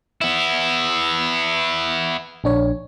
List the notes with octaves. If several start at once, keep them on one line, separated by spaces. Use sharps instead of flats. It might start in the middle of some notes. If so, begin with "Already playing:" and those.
B3 E4
A#1 D4 C#5